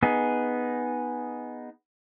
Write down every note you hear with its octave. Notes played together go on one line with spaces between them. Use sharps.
B3 D#4 G#4